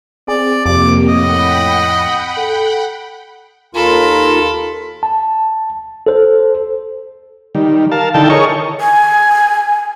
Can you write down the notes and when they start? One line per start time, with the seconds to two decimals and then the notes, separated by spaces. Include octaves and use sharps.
0.28 C4 G#4 D5
0.66 F2 C3 A#3 G4 D6
1.09 A2 D#5 F#5 G5 B5
2.38 A4
3.75 D#2 F4 A4 A#4 B5
5.03 A5
6.07 A4 C5
7.55 D#3 G3
7.92 A#4 F5 A5
8.14 D3 D#3 E4 A4 G5 A5
8.30 G#4 A#4 C#5 D#5 C#6
8.81 G#5